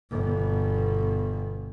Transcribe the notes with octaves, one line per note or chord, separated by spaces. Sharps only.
G1 B2